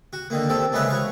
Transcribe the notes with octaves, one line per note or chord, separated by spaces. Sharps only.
F#4
D3 D#3 A#3
C4 G4 A4
C#3 E3 G#3 A3 B4
F#4 C#5 F5